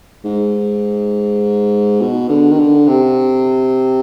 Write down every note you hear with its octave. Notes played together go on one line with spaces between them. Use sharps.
G#2
B2
D3
D#3
D3
C3